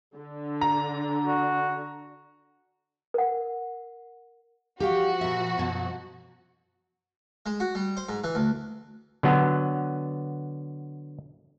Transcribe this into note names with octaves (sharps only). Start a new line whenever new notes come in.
D3
A#5
F#4
A#4 F#5
F3 F#4 G4 F5 G5
A#2 E5
F#2 B2 F#3
G#3
F#4
G3
C5
G#2
E3
D2
D3 F#3 B3